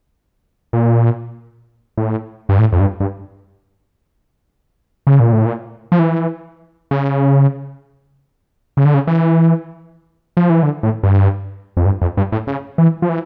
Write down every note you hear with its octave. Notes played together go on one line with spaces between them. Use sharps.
A#2
A2
G2
A2
F2
G2
G2
C#3
A#2
A2
A#2
F3
E3
C#3
C#3
D3
C#3
E3
F3
E3
D3
A2
G2
F2
G2
F2
G2
A2
C#3
E3
F3
E3